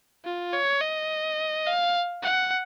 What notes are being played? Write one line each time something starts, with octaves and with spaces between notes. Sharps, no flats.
F4
C#5
D#5
F5
F#5